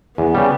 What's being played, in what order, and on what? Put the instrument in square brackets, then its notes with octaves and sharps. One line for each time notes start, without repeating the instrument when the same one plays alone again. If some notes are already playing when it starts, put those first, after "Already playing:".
[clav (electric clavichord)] E2 [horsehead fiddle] B3
[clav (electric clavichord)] C#3 G3